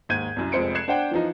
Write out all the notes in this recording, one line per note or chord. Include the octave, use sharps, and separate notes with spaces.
D#2 G#2 G6 G#6 D#7
C2 F#2
F1 F2 G#3 C5 C#7 D7
F#6 G#6 C7 C#7 E7
D4 C5 F#5 G5
E3 F3 D#4